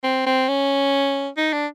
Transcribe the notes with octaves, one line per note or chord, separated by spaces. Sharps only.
C4
C4
C#4
D#4
D4